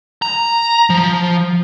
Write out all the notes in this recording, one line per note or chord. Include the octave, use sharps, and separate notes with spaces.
A#5
F3